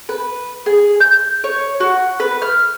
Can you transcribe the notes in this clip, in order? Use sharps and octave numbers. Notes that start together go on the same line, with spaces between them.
B4
G#4
G6
C#5
F#4
B4
F6